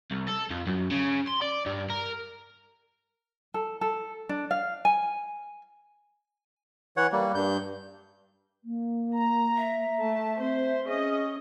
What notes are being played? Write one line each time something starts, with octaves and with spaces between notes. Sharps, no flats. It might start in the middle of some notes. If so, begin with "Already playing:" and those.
C2
A4
F2
F#2
C#3
C6
D5
G2
A#4
A4
A4
D4
F5
G#5
E3 C#5 F#5
G3 A#3
G2 G6
A#3
A#5
E5
A3 A5
C4 C5
C#4 G#4 D#5